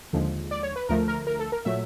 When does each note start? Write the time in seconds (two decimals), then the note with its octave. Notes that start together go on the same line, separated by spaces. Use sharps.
0.13 D#2 D3 F3 G#3
0.51 D5
0.63 C#5
0.76 B4
0.89 D2 D3 F3 A3 A#4
1.08 A#4
1.27 A#4
1.39 A4
1.52 A#4
1.65 A#2 F#3 A3 E5